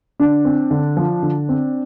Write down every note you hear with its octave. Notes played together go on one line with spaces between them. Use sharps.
D3 D4
C4
D3
F3
D3
C4